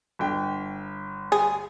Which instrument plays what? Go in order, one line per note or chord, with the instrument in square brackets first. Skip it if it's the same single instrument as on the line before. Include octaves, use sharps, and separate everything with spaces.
[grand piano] G1 G5
[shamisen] G#4